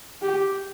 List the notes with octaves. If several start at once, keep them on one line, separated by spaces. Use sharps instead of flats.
G4